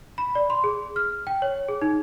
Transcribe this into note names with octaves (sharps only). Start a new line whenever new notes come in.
B5
D5
C6
G#4
F6
G5
C#5
G#4
D#4